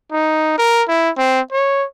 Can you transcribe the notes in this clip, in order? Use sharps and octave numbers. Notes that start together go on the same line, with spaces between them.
D#4
A#4
E4
C4
C#5